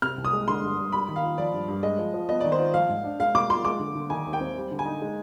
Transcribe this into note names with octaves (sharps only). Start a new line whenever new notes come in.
C3 F6
C2
D#6
G#3
D3 C6
G2
G2
G3 B5
D#3
F5
F4
F3 D5
G2
G2
G#3 D#5
F3
F3
B3 D#5
D#3 D5
C5
F4
F3 F5
G#2
D4
G#3 F5
B2 D6
F4 C6
G#3 D6
D3
D3
D#3 G#5
D#2
G5
C4
G3
D3
G#5
D#4
G#3